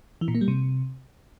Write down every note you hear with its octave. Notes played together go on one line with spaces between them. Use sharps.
E3
A#2
A#3
G3
C3